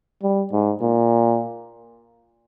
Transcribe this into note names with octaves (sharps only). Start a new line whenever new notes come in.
G3
G#2
A#2